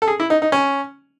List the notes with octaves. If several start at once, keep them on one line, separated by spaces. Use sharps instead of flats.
A4
G#4
E4
D#4
D#4
C#4